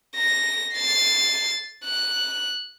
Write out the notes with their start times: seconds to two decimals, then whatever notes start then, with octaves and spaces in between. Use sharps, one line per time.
0.16 A#6
0.75 A6 C7
1.85 F#6